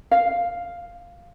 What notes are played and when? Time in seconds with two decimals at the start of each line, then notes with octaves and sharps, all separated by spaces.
0.11 F5